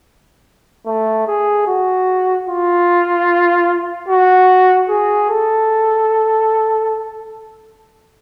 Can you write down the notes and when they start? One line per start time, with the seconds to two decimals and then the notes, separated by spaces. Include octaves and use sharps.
0.86 A3
1.27 G#4
1.67 F#4
2.47 F4
4.09 F#4
4.89 G#4
5.30 A4